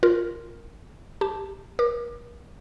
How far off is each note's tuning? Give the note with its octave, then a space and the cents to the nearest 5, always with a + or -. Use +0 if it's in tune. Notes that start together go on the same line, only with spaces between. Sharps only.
F4 +0 A#4 +0
G4 +0 A5 +0
A#4 +40 D6 +30